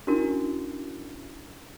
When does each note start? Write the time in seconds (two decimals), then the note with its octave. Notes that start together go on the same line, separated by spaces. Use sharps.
0.07 C#4 D4 E4 F#4 A#4